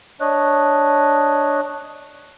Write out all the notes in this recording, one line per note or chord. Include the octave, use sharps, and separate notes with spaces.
D4 C#5 D#5 F#6